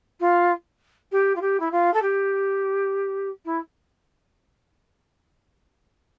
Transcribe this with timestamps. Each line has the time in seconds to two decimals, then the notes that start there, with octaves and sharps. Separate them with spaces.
0.20 F4
1.11 G4
1.35 F4
1.41 G4
1.60 E4
1.71 F4
1.93 A4
2.02 G4
3.45 E4